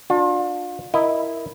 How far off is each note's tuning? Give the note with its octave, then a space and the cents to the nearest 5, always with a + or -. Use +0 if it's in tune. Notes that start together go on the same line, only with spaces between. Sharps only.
D4 +10 F4 +35
E4 +0 A#4 +0 D#5 +0